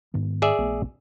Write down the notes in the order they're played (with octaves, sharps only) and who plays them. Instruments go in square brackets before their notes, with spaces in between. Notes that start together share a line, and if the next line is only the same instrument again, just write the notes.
[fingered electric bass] G#2 D#3 B3
[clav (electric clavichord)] G#4 D5 E5
[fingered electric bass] A#1 A3 B3